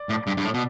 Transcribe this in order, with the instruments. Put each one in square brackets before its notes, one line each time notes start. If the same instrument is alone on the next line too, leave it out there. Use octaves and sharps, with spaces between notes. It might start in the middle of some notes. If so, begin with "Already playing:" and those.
Already playing: [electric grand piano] D5
[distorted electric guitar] A2
G2
G2
A2
B2